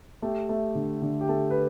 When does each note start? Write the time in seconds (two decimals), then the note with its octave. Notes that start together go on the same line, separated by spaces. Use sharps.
0.22 A3 G4
0.49 A3
0.75 D3
1.02 D3
1.21 G4
1.29 A3 A4
1.51 B4